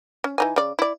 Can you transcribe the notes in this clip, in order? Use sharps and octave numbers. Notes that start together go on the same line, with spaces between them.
C#4
E3 D#4 G#5
C#3 D5
E4 D5